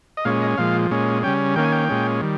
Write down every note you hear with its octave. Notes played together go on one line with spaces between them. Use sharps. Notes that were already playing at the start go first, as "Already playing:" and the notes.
D#5
A#2 G#3 C#4 F5
D#5
A#2 F3 G#3 F5
A#2 G#3 C#4
C#3 G3 C#4 G5
D#3 A#3 C#4 G5
G#5
G5
A#2 G#3 C#4
D#3 G3